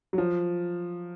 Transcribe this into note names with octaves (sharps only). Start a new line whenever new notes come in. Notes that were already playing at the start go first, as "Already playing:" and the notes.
F#3
F3